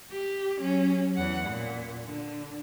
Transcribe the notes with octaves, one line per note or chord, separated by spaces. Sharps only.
G4
F#3 C#4
E2 F#5
A#2
D3